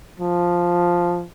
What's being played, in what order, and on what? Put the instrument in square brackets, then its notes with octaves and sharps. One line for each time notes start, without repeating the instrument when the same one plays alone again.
[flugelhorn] F3